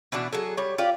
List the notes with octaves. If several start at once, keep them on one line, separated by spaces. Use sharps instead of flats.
B2 E3 D4 F#4
F#3 G#4 A4
G3 C#5
F4 G4 D5